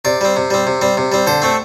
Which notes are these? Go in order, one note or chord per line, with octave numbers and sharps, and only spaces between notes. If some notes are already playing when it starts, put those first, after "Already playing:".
C3 D5
G3 C4
C3
G3 C4
C3
G3 C4
C3
G3 C4
D3 C5
A3 C4